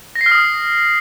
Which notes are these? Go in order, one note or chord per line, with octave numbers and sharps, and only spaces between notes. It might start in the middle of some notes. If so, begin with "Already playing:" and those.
A#6
C7
F6
D#6